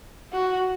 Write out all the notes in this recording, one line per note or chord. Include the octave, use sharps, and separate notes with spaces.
F#4